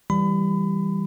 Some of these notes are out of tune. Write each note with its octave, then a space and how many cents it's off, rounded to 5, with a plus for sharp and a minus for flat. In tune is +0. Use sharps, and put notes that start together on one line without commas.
E3 +0 G3 +0 B5 +30